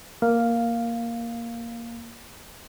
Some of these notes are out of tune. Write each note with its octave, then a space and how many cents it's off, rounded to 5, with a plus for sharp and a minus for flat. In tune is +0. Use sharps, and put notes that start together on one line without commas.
A#3 +0 F5 +0